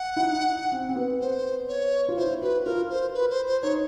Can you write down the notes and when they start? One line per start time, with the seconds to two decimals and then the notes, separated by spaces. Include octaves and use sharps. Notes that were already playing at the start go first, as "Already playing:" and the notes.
Already playing: F#5
0.16 E4
0.23 D#4
0.72 C4
0.89 C4
0.96 B3
1.20 C5
1.68 C#5
2.08 F4
2.17 E4 C5
2.41 F#4 B4
2.65 F4 A#4
2.90 C5
3.14 B4
3.30 C5
3.46 C5
3.62 D#4 C#5